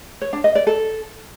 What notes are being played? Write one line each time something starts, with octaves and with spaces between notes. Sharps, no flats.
C#5
D4
D#5
D5
A4